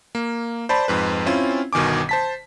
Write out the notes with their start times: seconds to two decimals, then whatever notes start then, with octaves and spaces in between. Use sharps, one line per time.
0.15 A#3
0.69 C5 D5 A5 B5
0.88 F2 G#2 B4
1.26 C4 C#4 E4 F4
1.73 G1 B2 D#3 G#5 D6
2.09 C5 A5 B6